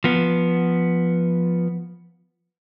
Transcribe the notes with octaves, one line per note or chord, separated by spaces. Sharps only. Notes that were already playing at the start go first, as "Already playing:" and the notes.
F3 B3